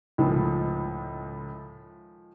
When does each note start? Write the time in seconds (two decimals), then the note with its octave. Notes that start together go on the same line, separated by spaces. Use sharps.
0.18 C#2 A2 D#3 F3 G#3